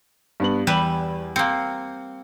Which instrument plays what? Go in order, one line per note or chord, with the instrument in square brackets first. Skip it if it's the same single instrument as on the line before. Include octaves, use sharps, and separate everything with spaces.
[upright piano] G2 B3 F#7
[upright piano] E2 [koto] G3 B4 E5
[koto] A#3 C4 [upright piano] C#7